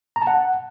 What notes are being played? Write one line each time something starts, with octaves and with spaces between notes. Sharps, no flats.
A#5
A5
F#5